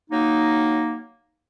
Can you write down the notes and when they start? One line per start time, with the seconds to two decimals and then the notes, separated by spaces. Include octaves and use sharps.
0.11 F#3 A#3 D#4